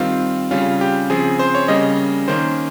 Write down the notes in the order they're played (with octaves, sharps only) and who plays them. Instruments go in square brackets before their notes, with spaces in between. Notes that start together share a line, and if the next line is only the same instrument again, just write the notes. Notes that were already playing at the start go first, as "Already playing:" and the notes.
Already playing: [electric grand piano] D#3 G3 C4 F4
C#3 G3 C#4 F4
G4
C#3 F3 C4 G#4
C5
C#5
C#3 G3 A#3 C#4 D#5
D#3 A#3 C#4 C5